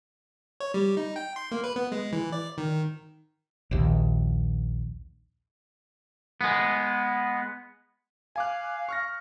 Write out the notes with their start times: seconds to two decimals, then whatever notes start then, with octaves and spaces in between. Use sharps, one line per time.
0.60 C#5
0.74 G3
0.97 D#4
1.16 G5
1.36 C6
1.51 A#3
1.64 B4
1.76 B3
1.92 G#3
2.13 E3
2.32 D5
2.58 D#3
3.71 A#1 D#2
6.41 G#3 B3
8.36 F5 G#5 D6 F#6
8.89 C#6 F6 A#6